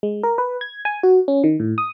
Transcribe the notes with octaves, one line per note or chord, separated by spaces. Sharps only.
G#3
A#4
B4
G#6
G#5
F#4
C#4
D#3
A2
D#6